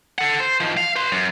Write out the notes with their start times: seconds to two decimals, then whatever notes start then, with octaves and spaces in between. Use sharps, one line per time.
0.18 A4 F#5
0.40 C5
0.60 D#3 F3
0.77 F5
0.96 B4 C6
1.12 F#2